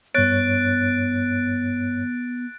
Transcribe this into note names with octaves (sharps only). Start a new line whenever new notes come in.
G2 B3 C#5 F#6 A6 D7